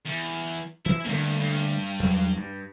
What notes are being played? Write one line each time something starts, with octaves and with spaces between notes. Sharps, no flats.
E2
E3 E4
E2 G2 D3 A3 A#3
G2
E2 F#3
G2